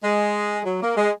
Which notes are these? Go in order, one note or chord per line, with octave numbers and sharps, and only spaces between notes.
G#3
F#3
A#3
G#3